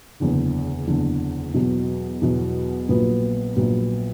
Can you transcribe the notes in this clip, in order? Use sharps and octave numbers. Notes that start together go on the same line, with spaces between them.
F#1 E2 D3
F#1 E2 D3
E2 B2 F#3
E2 B2 F#3
A#1 A#2 F#3 B3
A#1 A#2 F#3 B3